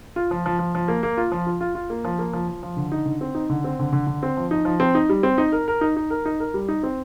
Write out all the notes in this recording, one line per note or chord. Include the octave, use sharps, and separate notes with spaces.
F4
F3
F3
F3
F3
A#3
A#3
F4
F3
F4
F4
F4
A#3
F3
A#3
F3
F3
F3
D3
D#4
D3
C4
D#4
D3
C4
D3
D3
D3
C4
F3
D#4
F3
C4
D#4
G3
C4
D#4
A#4
A#4
D#4
D#4
A#4
D#4
A#4
G3
D#4
C4